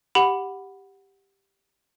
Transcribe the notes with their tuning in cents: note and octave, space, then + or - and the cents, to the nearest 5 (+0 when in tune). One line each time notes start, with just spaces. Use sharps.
G4 +0 F#5 +0 B5 +0